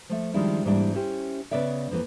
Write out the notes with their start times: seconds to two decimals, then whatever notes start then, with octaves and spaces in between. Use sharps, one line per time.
0.09 F3 A3 E5
0.34 D#3 F3 G3 G#3 D4 E4
0.65 G#2 E3 G3 A#3 D4 E4
0.94 C#4 E4 G4 C5
1.51 C#3 B3 B4 D5 E5
1.91 F2 E3 A#3